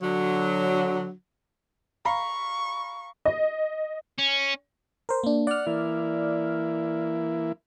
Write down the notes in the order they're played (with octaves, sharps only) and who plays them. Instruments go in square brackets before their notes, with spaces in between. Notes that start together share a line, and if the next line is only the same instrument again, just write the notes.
[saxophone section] D3 F#3
[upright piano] F5 A#5 B5 [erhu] C#6
[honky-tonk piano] D#5
[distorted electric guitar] C#4
[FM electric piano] A#4 C5
A#3 D4
[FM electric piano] D5 F6 [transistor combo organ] F#5
[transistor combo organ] E3 A#3 E4